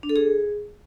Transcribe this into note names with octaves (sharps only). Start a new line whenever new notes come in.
D4
A4
G#4